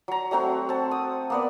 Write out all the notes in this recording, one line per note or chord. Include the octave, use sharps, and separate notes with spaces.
F#3 A#5
F#3 A3 C4 F#4
C4 A5
D#6
A#3 B3 D5